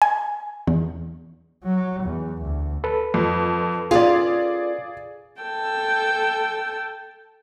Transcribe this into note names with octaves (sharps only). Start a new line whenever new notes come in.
G#5
E2
F#3
E2
D2
A4 B4
F2
C#4 F4 G#4 D5
A4 G5 A5 E6